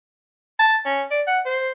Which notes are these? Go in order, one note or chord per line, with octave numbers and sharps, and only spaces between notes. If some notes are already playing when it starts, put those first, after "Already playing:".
A5
C#4
D5
F#5
C5